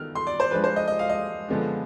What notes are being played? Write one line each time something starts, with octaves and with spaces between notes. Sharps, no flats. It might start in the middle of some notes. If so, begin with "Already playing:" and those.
Already playing: D#3 B3 F6
C6
D5
C5
F3 G#3 D4 B4
C5
D#5
D#5
F5
D#5
D3 F3 G#3 B3 D4